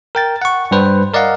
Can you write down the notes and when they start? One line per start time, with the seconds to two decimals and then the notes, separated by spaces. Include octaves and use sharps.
0.15 A#4 G5 A6
0.42 F#5 C#6
0.71 G2 G3 B4 C5
1.14 A#4 D5 D#5 F5 F#5